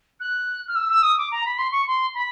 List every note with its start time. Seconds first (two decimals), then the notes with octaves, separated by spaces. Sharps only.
0.20 F#6
0.68 F6
0.75 E6
0.89 E6
1.02 D#6
1.17 D6
1.31 A#5
1.45 B5
1.58 C6
1.72 C#6
1.87 C6
2.14 B5